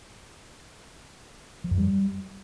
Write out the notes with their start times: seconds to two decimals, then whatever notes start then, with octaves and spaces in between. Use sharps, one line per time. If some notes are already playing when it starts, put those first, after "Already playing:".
1.64 F3
1.71 F#2
1.78 G3